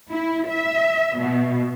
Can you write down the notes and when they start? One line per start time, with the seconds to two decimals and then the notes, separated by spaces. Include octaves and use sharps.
0.10 E4
0.47 E5
1.19 B2